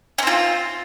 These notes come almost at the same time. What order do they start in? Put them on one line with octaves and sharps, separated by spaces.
C#4 C4 F4